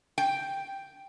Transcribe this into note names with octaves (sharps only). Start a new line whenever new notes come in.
G5